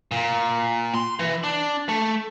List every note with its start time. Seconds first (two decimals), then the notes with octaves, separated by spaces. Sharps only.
0.11 A#2
0.94 C6
1.19 E3
1.44 D4
1.89 A3